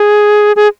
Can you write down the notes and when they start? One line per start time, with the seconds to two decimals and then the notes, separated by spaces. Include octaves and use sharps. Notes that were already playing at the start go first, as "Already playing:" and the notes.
Already playing: G#4
0.56 G#4